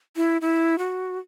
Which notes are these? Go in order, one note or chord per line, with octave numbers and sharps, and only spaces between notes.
E4
E4
F#4